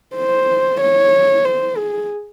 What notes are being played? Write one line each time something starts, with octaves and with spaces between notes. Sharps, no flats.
C5
C#5
C5
G#4